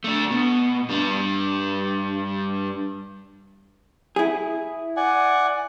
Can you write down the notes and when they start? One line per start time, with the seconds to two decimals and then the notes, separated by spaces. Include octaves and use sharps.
0.04 A3 D4
0.31 B2
0.89 G2 D4
4.16 E4 G#4
4.97 D5 F#5 G#5